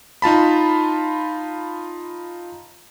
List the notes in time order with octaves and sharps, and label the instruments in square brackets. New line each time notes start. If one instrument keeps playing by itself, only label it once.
[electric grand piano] D#4 F4 A5 B5